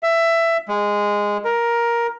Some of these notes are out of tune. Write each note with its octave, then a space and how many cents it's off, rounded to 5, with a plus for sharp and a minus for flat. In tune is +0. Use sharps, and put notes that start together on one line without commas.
E5 +15
G#3 -10
A#4 +10